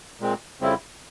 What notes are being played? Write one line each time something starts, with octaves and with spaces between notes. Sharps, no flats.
A#2 G#3 C4
F2 C#3 G3 C4 E4